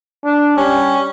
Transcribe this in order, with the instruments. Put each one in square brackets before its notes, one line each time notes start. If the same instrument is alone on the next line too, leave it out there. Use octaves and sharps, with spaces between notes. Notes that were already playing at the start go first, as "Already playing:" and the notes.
[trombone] D4
[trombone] G3 [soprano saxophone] C#4